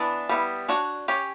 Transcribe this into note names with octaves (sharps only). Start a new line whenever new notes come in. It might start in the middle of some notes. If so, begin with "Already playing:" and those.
Already playing: E3 B3 D4
G3 B3 E4
D4 F#4 C#5
C#4 G4 C#5